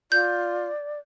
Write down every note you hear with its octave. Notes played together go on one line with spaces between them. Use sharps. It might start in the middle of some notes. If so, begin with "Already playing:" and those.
F4 D5 G6